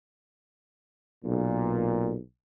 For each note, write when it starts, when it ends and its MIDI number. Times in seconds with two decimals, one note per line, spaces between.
1.25 2.15 35
1.25 2.15 46